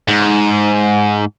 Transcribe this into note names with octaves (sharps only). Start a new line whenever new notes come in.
G#2